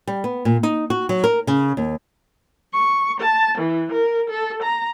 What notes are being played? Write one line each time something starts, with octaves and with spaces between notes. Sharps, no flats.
G3
B3
A#2
D#4
F#4
F#3
A#4
C#3
D#2
C#6
A5
E3
A#4
A4
A#5